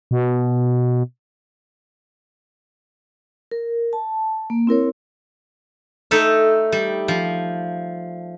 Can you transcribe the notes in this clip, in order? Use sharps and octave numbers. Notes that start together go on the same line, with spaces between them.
B2
A#4
A5
A#3
C4 E4 A#4 C#5
A3 D#4 A4 E5
G3
F3